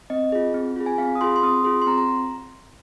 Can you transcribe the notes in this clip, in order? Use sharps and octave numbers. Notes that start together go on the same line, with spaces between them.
C4 D#5
F4 G#4
C4
F4 G#4
G#5
C4 F5
D#6
F4 G#4 C6
C6
C4 D#6
F4 G#4 C6
C6
C4 A#5
A#5